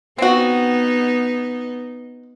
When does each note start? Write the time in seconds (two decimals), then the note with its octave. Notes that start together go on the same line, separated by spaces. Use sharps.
0.18 B3 C4 D#4 F#4